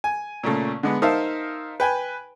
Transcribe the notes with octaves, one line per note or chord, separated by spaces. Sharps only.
G#5
A#2 C#3 A3
D3 G#3 B3
D#4 A#4 C5 E5 F5 A5
B4 G5 G#5